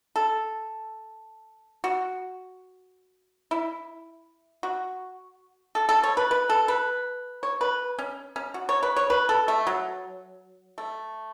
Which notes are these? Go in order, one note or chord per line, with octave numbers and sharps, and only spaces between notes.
A4
F#4
E4
F#4
A4
A4
C#5
B4
B4
A4
B4
C#5
B4
C#4
C#4
F#4
C#5
B4
C#5
B4
A4
A3
F#3
A3